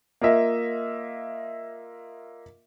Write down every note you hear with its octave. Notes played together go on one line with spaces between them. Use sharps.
A#3 F4 D#5 E5